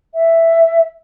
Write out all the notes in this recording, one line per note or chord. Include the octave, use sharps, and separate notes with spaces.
E5